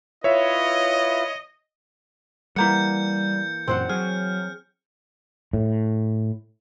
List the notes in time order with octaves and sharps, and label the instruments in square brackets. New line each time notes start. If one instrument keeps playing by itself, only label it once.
[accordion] E4 F4 B4 [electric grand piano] C#5 E5 [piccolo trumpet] D#5
[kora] E3 A#3 F#5 [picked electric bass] G3 [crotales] G6 C#7
[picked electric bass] F#2 A#2 E3 [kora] C4 C5 F#5
[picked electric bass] F#3 [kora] G#4 [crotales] F6
[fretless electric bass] A2